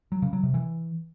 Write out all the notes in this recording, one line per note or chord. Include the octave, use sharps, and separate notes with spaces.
F#3
C#3
F#3
C3
E3